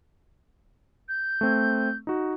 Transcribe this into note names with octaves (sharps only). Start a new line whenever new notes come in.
G6
A3 C4
D#4 F#4